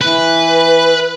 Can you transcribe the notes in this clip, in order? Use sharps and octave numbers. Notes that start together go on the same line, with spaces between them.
E3 B4